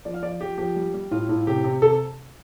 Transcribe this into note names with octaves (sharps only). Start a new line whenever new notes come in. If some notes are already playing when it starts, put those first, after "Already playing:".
F3 D5
F5
F3 D5
F3 G4
F3 G4
G3
G3
A2 F4
A2
C3 G4
C3
C3 A4